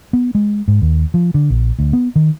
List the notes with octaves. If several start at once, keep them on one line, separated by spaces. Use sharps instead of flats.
B3
G#3
G#2
D#2
F3
D3
A#1
D2
B3
D#3